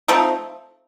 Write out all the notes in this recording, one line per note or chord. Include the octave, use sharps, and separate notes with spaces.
F3 A3 C4 D#4